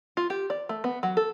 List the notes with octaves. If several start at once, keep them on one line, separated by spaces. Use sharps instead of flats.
F4
G4
D5
A3
B3
F#3
A4